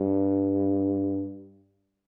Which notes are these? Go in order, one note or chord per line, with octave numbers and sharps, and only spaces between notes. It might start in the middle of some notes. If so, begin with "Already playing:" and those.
Already playing: G2